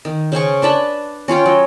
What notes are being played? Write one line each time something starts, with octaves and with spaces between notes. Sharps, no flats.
D#3
C#3 C5 G#5 C#6
D4 B4 A5 B5
C#4 F4 C#5 G5
F#3